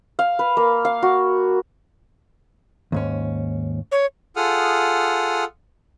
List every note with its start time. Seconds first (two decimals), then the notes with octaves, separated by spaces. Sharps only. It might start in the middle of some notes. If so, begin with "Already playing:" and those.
0.19 F5
0.39 B4
0.57 A#3
0.85 F5
1.02 F#4
2.92 D#2 G#2 C#4
3.92 C#5
4.36 F4 G#4 A4 F#5 D#6 F6